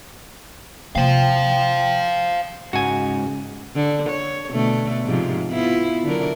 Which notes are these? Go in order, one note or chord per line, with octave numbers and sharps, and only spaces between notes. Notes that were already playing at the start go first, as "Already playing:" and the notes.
C3 A#3 C5 F5 G5
G#2 C#3 F#4 G#5
D3
C#5
B2 D3 A3
G#2 C3 F3
B3 E4 F4
D3 F#3 A#4